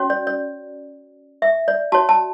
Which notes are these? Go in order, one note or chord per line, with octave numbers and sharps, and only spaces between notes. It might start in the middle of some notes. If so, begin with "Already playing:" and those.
Already playing: C#4 F#4 C#5
D5
D5
E5
D5
F#4 C#5 A5
A5